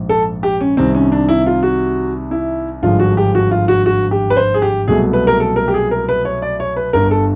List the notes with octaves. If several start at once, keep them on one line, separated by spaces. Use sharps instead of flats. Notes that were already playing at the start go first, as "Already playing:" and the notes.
Already playing: A#1 G#2 F3
A4
G4
C#4
C2 C3 D#3 C4
C#4
D4
E4
F4
F#4
E4
G#1 G2 D3 F3 G#3 F4
F#4
G4
F#4
F4
F#4
F#4
G4
B4
C5
G#4
G4
C2 B2 F#3 A3 G#4
B4
A#4
A4
A#4
G4
G#4
A#4
B4
C#5
D5
C#5
B4
G1 G2 D3 A#4
A4